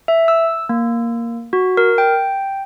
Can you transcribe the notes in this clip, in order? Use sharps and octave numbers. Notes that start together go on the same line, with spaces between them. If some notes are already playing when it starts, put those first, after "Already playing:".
E5
E6
A#3
F#4
A#4
G5